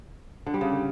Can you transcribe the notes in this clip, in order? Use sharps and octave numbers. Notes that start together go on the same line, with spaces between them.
D3
G3
C#3